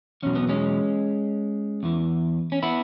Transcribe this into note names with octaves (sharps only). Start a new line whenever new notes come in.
E2 B2 F#3 C#4
B3
G#3 C#4
E2 E3
C#4
B3 E4